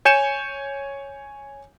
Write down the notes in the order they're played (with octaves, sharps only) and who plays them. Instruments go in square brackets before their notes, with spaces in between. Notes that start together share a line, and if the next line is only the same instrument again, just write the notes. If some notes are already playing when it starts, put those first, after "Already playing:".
[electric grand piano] C#5 G#5 G6 C#7 E7